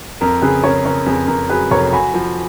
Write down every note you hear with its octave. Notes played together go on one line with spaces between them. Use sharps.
F2 A#4
C#3 G#4 B4
C#3 A#4 C#5
C#3 A#4 C#5
F2 G#4 B4
F2 A#4
F#3 G#4 B4
F1 A#4 C#5
F#4 G#5 B5
F3